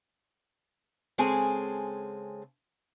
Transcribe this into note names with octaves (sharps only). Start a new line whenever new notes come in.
C#3 G#3 C4 G#4 A4 G#5